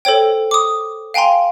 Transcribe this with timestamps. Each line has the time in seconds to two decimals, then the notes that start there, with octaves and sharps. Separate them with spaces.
0.05 A4 C5 C#5 G5
0.51 D6 D#6
1.14 F5 G5 G#5 A#5 C6